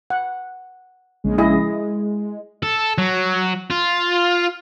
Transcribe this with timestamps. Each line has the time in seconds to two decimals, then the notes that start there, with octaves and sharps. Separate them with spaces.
0.10 F#5
1.24 A#1 C#3 G#3
1.38 E4 G#4 D#5
1.61 G#3
2.63 A4
2.98 F#3
3.70 F4